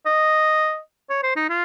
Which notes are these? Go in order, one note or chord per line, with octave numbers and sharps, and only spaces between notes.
D#5
C#5
C5
D#4
F4